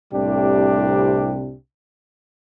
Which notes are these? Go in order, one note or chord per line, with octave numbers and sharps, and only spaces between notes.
C2 A2 C3 G3 D4 G4